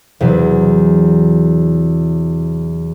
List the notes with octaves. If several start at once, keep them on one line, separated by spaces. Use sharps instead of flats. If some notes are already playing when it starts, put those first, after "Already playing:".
E2 C3 F#3